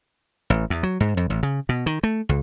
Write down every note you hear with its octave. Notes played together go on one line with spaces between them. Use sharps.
A1
E2
F#3
G#2
F2
A1
C#3
B2
D#3
A3
C#2